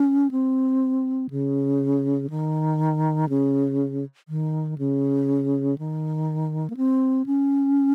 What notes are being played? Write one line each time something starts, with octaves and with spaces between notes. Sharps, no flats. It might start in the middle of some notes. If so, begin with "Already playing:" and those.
Already playing: C#4
C4
C#3
D#3
C#3
D#3
C#3
D#3
A#3
C4
C#4